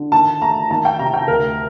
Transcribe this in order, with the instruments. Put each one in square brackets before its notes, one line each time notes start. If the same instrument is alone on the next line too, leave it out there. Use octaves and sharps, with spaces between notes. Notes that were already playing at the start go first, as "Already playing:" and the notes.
Already playing: [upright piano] D3
D#3 A5
A3 A#5
D#3 A5
G5
C3 A#5
G5
D2 A#4